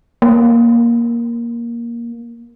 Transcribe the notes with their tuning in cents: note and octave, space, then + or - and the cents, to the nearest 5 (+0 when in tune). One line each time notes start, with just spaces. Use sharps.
A#3 +10